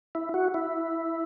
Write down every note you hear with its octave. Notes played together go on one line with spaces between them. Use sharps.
E4
F#4
E4